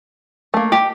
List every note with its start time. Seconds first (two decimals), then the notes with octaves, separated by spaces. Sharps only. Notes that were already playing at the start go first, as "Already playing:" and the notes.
0.54 A3 A#3
0.72 G4